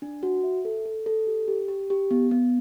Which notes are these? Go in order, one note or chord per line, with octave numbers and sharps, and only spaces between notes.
D4
F#4
E5
A4
A4
A4
G4
G4
G4
G4
B3
B3